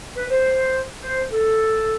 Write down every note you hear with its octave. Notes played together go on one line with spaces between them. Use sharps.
B4
C5
C5
A4